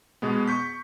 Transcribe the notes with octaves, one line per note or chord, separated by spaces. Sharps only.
B2 G#3 B3
C#6 G6 B6